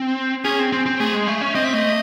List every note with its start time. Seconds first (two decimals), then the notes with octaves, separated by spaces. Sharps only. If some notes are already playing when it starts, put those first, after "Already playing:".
Already playing: C4
0.44 C#4 G#4
0.59 C4
0.72 C4
0.86 C4
1.00 A3 G#4
1.14 G#3
1.28 A3
1.41 C#4
1.55 C4 D#5
1.64 E5
1.73 A3 D#5